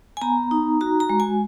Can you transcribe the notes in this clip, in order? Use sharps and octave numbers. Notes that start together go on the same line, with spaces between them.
G#5
B3 A#5
D#4
F#4 A#5
A#5
G#3
G#5